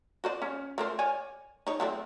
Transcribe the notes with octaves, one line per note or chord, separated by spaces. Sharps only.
F#4 C5 D5
C#4
A3 A#4 C5
C#5 D5 G#5
D#4 C#5
F#3 A3 C4